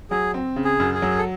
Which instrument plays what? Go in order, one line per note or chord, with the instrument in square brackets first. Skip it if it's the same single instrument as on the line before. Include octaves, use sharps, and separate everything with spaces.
[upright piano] F#3 [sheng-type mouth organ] G#4
[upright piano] C4
C#3
[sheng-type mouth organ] G#4
[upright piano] F#2
[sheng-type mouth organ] G#4
[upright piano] F#3
[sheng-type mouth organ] A4